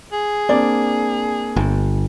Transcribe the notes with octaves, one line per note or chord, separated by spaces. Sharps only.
G#4
A#3 C4 D4 D5
G1